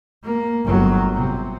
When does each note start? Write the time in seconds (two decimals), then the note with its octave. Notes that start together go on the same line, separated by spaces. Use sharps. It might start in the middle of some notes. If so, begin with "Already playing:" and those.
0.24 A#3
0.65 G1 F#3
1.14 C3